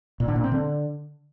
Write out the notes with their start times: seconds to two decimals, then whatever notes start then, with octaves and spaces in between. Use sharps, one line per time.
0.20 A#2
0.28 D3
0.36 A#2
0.44 C4
0.52 D3